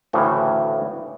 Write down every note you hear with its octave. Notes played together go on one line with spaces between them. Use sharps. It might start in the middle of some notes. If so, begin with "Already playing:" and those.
D2 A2 C#3 E3 A3